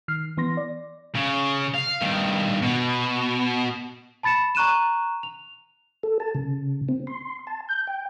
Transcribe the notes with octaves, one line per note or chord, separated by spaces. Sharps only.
D#3 F6 C7
E3 B3 C6 A#6
D5
C#3
F5
G2 D#3
B2
A5 B5 A6 C#7 E7
A#5 C#6 F#6 D#7 E7
F7
A4
A5
C#3
C4
C6
A5
G6
G5